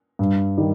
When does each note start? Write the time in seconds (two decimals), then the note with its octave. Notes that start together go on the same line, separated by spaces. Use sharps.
0.19 G2
0.57 D#3 G3